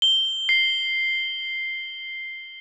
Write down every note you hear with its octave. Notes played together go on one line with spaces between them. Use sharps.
G7
C7